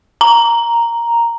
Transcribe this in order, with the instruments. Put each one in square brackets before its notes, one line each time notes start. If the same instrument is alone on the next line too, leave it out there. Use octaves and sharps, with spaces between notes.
[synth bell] A#5